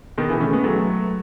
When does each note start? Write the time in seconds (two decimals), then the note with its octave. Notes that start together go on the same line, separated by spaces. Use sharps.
0.18 B2 D#3
0.29 C#3 E3
0.40 A3 C#4
0.53 G#3 B3
0.64 F#3 A3